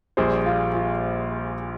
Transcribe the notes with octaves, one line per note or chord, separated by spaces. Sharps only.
A#1 A#2 G3 G#4 C5
F4
F4